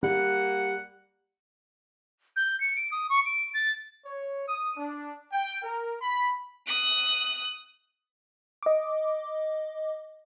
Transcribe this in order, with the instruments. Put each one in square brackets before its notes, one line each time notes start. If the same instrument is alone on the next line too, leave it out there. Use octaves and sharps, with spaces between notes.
[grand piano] G3 [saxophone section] A#3 F#5
[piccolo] G6
C#7
D7
D#6
C#6
D7
A6
[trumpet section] C#5
D#6
D4
G5
A#4
B5
[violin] D#6 F#6
[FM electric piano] D#5 D6